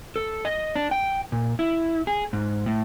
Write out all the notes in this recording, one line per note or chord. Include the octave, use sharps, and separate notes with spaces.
A4
D#5
D4
G5
A#2
E4
G#4
G#2
A2